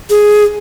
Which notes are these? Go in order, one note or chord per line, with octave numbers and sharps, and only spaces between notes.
G#4